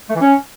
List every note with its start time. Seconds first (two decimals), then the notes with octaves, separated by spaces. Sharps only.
0.10 A3
0.15 E3
0.21 C#4